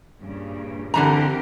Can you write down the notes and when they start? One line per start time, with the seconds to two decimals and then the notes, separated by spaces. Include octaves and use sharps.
0.21 G2 A#2 C#3
0.94 D3 E3 C4 G4 A#4 A#5